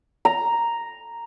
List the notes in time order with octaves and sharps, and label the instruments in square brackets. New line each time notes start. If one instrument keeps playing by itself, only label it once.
[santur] A#5